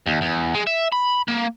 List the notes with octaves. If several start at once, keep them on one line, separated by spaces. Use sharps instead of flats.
D#2
E2
G#3
E5
B5
A#3